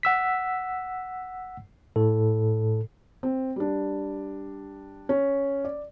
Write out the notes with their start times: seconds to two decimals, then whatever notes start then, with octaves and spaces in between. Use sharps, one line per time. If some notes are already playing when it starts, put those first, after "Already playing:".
0.03 F#5 E6 B6
1.96 A2 A4
3.23 C4
3.56 G3 D4
5.09 C#4
5.65 D5